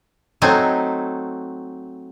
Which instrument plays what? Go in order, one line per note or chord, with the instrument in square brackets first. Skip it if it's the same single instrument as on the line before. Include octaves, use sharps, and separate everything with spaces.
[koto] F#3 A3 C4 D#4 G#5